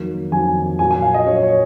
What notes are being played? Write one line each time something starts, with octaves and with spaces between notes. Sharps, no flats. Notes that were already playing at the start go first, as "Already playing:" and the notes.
Already playing: F2 D#3 F#3 A#3
F2 D#3 F#3 A#3 G#5
A#2 F#3 A#3 G#5
G#5
F5
D#5
A#2 F#3 A#3 C#5
C#5